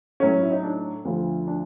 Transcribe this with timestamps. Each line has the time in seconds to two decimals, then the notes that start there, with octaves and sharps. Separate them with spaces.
0.20 A2 F#3 A3 C#4
0.41 E4
0.51 D#4
0.63 D4
1.05 D2 D3 F3
1.47 D4